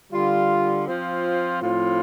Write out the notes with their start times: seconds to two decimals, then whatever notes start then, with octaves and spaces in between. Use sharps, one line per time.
0.10 D3 G3 F4
0.85 F3 C4 F4
1.61 A2 F3 C4 F4